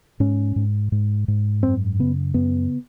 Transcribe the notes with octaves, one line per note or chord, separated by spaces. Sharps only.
G#2 C#4
G#2
G#2
G#2
F#2 C4
C#3 B3
F#2 B3